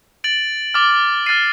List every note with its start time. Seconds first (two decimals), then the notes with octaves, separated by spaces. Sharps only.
0.24 A6 D7 F#7
0.74 D6 F6 A6
1.26 F6 A6 C7 D#7